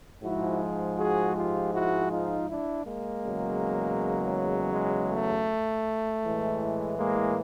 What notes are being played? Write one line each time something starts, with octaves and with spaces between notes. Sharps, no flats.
G#2 F3 G#3 E4 F#4
F#4 G#4
F4 G4
E4 F#4
D#4 F4
D4 E4
G#3 A#3
E2 C#3 F#3
G#3
A3
A2 E3 G#3
G#3 A#3